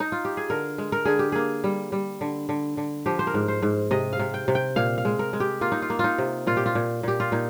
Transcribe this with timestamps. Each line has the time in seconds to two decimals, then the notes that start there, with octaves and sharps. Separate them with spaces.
0.00 D#4
0.12 F4
0.25 G4
0.37 G#4
0.50 D3 A#4
0.78 G#3
0.92 A#4
1.05 D3 G#4
1.19 G4
1.32 A#3 G#4
1.64 G3
1.92 G3
2.21 D3
2.49 D3
2.77 D3
3.06 F3 G4
3.19 C5
3.27 A#4
3.34 G#2
3.48 C5
3.62 G#2
3.91 C3 D#5
4.13 F5
4.20 C3
4.34 G5
4.48 C3
4.55 G5
4.76 A#2 F5
4.98 F5
5.05 G#3
5.19 A#4
5.33 G#3
5.40 G4
5.61 A#3 F4
5.72 D#4
5.82 F4
5.90 A#3
5.99 D#4 F4
6.18 C3
6.47 A#2 F4
6.57 G4
6.66 F4
6.75 A#2
7.03 A#2 G4
7.20 F4
7.32 A#2 D#4